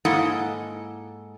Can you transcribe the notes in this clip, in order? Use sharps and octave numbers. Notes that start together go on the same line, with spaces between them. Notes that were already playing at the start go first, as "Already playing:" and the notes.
G#2 A#3 E4 A4 D#5 F#5